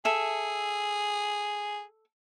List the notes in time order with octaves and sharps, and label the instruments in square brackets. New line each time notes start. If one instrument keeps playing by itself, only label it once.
[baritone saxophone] G#4 [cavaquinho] A4 E5